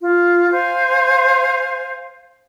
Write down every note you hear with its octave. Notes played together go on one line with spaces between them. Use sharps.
F4
C5 F5 G#5